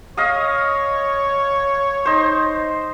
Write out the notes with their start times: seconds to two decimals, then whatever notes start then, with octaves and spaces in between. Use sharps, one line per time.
0.17 C#5 D#5 F5 D#6
2.05 D#4 C5